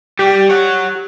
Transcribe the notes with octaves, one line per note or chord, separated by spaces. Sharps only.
G3 G4
C#5 F#5